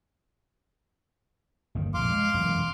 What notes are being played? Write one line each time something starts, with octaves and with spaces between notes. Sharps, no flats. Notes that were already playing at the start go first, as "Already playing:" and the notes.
G1 D#2 D#3
A#1 F2 F5 C6 D6
G#3
E1 F#2 E3